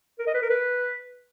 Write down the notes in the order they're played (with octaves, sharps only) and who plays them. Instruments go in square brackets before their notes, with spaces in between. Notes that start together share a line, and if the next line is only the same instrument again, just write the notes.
[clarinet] A#4
D#5
B4
A#4
B4